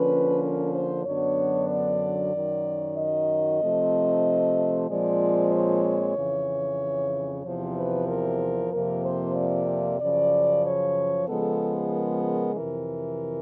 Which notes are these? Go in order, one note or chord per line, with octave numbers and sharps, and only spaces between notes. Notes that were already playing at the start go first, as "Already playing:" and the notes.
Already playing: D3 F3 A#3 C#4 B4
A#4
C5
F#2 D3 F#3 B3 D4 C#5
D5
F#2 D#3 F#3
D#5
C3 F3 A3 C4
A#2 F3 G#3 C4 D5
C#5
F2 C#3 E3
E2 C3 F3 C5
B4
A#4
F2 C3 F3 A#3 A#4
C5
D5
F#2 C#3 F3 D5
C#5
C#3 F3 G#3 B3 A4
A#4
A#4
F2 C3 E3 A#4